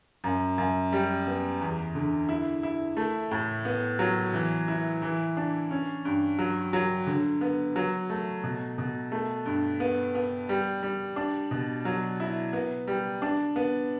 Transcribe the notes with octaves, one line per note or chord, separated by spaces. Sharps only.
F#2
F#2
G3
B3
E2
D3
E4
E4
A3
A2
B3
F#3
E3
E4
E3
D4
C#4
G2
F#3
F#3
D3
B3
F#3
A3
B2
B2
A3
G2
B3
B3
G3
G3
D4
B2
F#3
E4
B3
G3
D4
B3